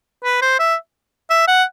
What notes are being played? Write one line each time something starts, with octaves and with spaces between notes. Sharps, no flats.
B4
C5
E5
E5
F#5